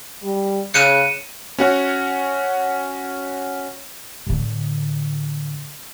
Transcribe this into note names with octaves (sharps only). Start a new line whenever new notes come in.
G3
C#3 F#6 C#7 D#7 E7
C#4 F#4 F#5
A2 D3